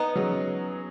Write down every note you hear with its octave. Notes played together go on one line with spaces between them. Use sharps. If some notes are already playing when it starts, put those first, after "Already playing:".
Already playing: B3 D#4
F#3 C#4 G#4